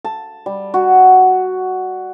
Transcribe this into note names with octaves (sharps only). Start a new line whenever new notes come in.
A5
G3
F#4